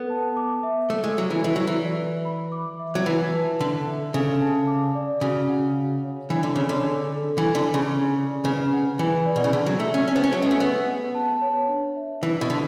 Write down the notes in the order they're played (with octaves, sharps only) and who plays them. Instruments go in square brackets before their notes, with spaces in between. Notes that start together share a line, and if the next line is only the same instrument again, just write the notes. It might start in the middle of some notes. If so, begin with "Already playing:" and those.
Already playing: [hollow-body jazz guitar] B3 [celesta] A4
[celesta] A5
D6
E5
[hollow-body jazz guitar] A3 [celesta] A4
[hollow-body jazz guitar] G#3
[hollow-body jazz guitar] F#3 [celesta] F#5
[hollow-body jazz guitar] E3
[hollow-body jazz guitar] E3 [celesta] A4
[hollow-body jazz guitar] F#3
[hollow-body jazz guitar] E3 [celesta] D5
[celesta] B4
B5
D6
E5
[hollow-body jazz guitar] F#3
[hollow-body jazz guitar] E3 [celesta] B4
[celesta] A5
[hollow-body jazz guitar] D3 [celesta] D6
[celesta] E5
[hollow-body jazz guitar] C#3 [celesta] A4
[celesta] A5
D6
D5
[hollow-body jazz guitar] C#3 [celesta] F#4
[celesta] F#5
F#4
C#5
[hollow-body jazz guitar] E3 [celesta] D4
[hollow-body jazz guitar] D3
[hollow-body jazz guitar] C#3 [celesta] C#5
[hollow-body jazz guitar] D3
[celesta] D4
A4
[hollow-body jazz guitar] E3 [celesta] A4
[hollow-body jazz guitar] D3
[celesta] G#5
[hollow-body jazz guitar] C#3
[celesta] C#6
D5
[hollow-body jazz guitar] C#3 [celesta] B4
[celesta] F#5
[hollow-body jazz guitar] E3 [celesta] B4
[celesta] D5
[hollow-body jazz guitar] B2
C#3
[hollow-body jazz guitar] D3 [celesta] G#4
[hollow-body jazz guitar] F#3
[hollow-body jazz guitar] A3 [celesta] E5
[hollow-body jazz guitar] C#4
[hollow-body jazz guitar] C#4 [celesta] A5
[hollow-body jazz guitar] B3
C#4
[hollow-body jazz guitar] F#3 [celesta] B4
[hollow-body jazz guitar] G#3
A3
[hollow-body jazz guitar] B3 [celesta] G#4
[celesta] F#5
A5
C#5
D4
E5
[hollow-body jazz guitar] E3 [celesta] D4
[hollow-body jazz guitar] B2
[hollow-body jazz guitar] D3 [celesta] A4